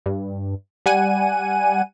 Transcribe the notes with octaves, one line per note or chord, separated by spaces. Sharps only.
G2
G3 F#5 G#5 D#7